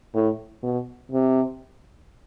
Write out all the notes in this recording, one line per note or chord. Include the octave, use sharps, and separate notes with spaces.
A2
B2
C3